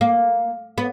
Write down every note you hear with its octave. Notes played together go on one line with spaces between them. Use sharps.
A#3
B3